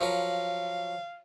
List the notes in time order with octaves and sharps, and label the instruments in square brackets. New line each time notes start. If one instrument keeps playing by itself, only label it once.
[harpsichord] F3 F#3 A#4 [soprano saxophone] F5